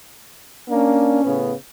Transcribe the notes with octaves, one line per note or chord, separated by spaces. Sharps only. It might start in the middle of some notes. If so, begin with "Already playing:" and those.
A#3 C#4 D4
A2 C#3 B3